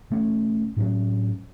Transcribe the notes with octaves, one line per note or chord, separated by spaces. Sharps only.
B2 A3 C#4
A2 F#3 C#4